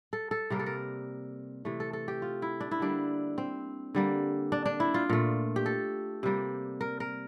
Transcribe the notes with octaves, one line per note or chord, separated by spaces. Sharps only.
A4
A4
C3 G3 A#3 A#4
A4
A#4
C3 E3 A3
A4
A4
G4
F4
E4
D4
E4
D3 G3 A#3 D4
C4
D3 G3 A#3
D4
D4
E4
F4
A#2 A3
G4
A4
C3 G3 A#3
A#4
A#4